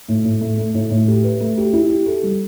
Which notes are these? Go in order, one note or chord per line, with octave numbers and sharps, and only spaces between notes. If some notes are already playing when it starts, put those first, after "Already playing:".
A2
A2
A3
A3
A2
A2
G4
B4
A3
G4
E4
G4
A4
G3